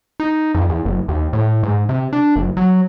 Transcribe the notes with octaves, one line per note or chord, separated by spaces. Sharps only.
D#4
F2
E2
F#1
D#2
A2
G#2
C3
D4
F#1
F#3